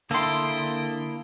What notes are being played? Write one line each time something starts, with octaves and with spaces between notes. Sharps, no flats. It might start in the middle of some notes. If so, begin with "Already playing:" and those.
D3 A#3 E4 A4 G5 C6 D#6